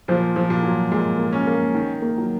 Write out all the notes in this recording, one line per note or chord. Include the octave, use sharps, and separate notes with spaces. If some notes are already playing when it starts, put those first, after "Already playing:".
A#2 F3
F3
A#2
F#3
A#2 G#3
A#3
C#4
A#3
D#3
A#3
F#3